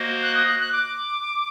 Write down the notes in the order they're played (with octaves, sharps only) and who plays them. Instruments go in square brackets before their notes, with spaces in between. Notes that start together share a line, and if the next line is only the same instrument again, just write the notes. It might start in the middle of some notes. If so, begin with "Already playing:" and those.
Already playing: [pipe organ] A#3 F#4 C5 D#5
[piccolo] F#6
D#6
F#6
F#6
D6